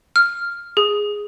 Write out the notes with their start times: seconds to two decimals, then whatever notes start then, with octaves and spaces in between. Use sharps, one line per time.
0.16 F6
0.77 G#4